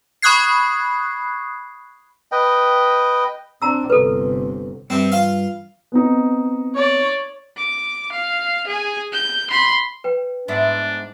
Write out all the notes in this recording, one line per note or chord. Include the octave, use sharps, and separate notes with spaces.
B5 C#6 D#6 F#6 G#6 C7
B4 D#5 G5
C4 D4 A#5 E6
G1 C3 A4 B4
G2 C3 C4
F4 F5
B3 C4 D#4
C#5 D5
D6
F5
G#4 G#5
G6
B5 C6
B4 G5
G#2 B3 D4 E4